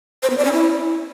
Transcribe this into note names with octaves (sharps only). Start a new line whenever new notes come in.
C5
B3
D5
C#4
E4